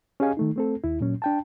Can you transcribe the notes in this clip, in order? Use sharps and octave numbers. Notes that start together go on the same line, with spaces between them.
C#4 G4 G#4 D#5 F5 G#5
D#3 A3 D#4
A3 C4 A4
D#2 E4
A#2 F#3 C#4
D4 G5 A5